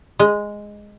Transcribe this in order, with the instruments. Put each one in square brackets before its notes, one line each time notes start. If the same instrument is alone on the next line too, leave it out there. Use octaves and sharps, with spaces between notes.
[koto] G#3